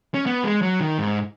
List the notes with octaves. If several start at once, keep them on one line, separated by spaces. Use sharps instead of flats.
C#4
B3
G#3
F#3
D#3
G#2